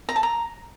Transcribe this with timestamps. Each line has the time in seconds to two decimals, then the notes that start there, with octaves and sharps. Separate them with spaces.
0.09 A#5
0.16 A5
0.23 A#5